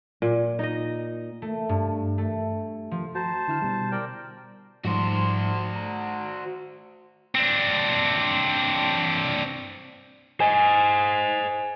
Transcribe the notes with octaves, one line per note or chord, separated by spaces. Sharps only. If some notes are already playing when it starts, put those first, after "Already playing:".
A#2
D#4 D#5
A3
G2
A3
F3
F#4 C5 A5 A#5
D3 E4 F6
B2 G3
A#4 D5 G5
G#2 F3 G3 F#4 C5
A#5
C4 D4
C5 D#5 G#5